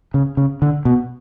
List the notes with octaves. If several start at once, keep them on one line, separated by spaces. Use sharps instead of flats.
C#3
C#3
D3
B2